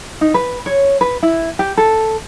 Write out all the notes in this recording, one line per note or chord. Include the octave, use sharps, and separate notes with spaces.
D#4
B4
C#5
B4
E4
G4
A4